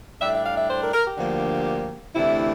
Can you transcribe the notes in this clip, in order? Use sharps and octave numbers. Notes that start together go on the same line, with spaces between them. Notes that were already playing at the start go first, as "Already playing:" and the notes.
A2 G3 D4 E5
E5
F5
E5
C5
A#4
A#4
G4
D2 D3 F3 A#3
D2 C3 E3 A3 D4 E4